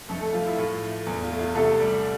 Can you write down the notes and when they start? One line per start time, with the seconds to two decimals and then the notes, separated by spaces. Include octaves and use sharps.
0.08 F2 A3 A4
0.21 A3 A4
0.33 F3 F4
0.45 E4
0.57 A2 F4
0.82 A3
1.06 E2
1.23 F4
1.31 A3
1.39 F4
1.55 C2 A3 A4
1.80 G3